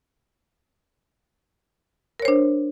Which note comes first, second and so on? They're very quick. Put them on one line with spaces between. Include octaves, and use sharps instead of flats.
A#4 C#5 C5 D4